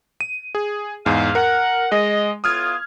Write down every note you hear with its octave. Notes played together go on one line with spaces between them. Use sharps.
D#7
G#4
E2 G#2 F5
A#4 F#5
G#3 D#5
A2 B3 F4 D#6 F6 G#6